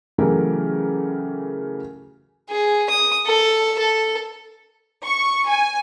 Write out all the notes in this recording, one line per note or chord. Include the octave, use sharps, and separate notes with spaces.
C#3 E3 F#3 A3 G4 A#4
G#4
D#6
A4
A4
C#6
G#5